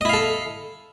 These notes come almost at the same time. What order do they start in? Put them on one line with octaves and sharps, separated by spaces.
D#5 E4 F5 A4